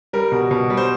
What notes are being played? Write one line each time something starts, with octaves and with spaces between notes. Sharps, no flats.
G3 A#4
B2
B2
G3
C5